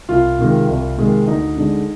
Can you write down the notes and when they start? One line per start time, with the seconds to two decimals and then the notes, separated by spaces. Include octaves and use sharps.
0.09 C2 F4
0.39 C3 D#3 G#3
0.68 C2
0.97 C3 D#3 G#3
1.27 D2 D#4
1.57 D3 G#3